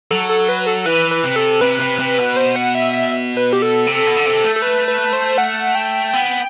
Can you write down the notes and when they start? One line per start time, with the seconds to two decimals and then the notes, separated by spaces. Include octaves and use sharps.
0.11 F#3 A4
0.29 A4
0.49 B4
0.67 A4
0.85 E3 B4
1.11 B4
1.24 C3
1.36 A4
1.61 C3 B4
1.80 C3
1.99 C3
2.18 B2
2.37 C5
2.56 F#5
2.75 E5
2.93 E5
3.37 B4
3.53 G4
3.62 A4
3.87 C3
4.06 B2
4.16 D3
4.25 C3
4.44 A3
4.56 A4
4.62 B4
4.88 B4
5.13 C5
5.38 F#5
5.75 G5
6.13 B3